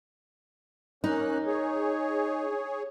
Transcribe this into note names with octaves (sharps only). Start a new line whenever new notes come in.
A#3 C#4 D#4 F#6
G#4 C#5